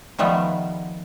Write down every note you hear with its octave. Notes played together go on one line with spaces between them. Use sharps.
D#3 F3 G3 A3 B3